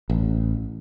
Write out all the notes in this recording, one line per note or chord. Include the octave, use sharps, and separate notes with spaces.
A1